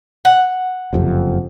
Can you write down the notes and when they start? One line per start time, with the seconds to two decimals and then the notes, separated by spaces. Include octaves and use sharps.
0.25 F#5
0.93 F#1 F2 C3